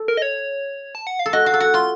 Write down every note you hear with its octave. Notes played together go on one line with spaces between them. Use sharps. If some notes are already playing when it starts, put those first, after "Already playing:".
Already playing: A4
A#4
D#5
C#5
A5
F#5
F5
A4
F#4 D#5
F#4 F5
A4
F#4 F#5
F4 C6